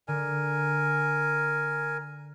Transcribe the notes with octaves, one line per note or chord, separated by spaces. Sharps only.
D3 A#4 G#5